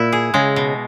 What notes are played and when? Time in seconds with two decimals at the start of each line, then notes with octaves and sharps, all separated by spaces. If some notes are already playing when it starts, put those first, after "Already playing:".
Already playing: A#2 E4
0.12 G#4
0.34 C#3 G#3
0.56 B2